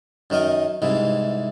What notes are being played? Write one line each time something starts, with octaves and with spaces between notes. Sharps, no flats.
F#2 D#3 A#4 D#5
C2 G#2 C3 E3